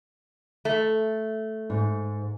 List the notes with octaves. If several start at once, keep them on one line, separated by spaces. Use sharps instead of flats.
A3
G#2